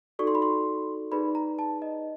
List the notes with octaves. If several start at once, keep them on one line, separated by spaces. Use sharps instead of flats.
D#4 F#4 A4 D5 C#6
C6
B5
C6
D#4 G#4 B4 D5 B5
A#5
A5
D#5